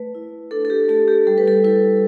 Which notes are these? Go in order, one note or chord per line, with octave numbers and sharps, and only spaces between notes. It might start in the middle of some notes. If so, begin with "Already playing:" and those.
Already playing: A3 B4
E4
D4 A4
A4
G4
A3 A4
G4
G3 A4
B4
A4
E4 B4